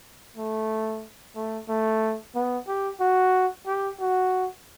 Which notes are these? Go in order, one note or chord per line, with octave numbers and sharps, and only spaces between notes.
A3
A3
A3
B3
G4
F#4
G4
F#4